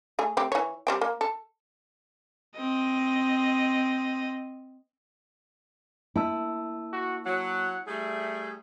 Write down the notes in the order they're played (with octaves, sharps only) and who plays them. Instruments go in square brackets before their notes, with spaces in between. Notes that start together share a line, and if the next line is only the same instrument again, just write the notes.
[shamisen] A3 G#4
A3 C4 G4
E3 C#5
G3 C4 G5
A#3
A4
[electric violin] C4 D#5
[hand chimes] A#3 A5 E6 [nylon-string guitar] E4
[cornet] F#4
[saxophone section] F#3 [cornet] F#5
[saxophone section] G3 A3 [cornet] G#4